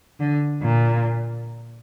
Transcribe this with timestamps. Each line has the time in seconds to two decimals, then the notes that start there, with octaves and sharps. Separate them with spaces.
0.20 D3
0.63 A#2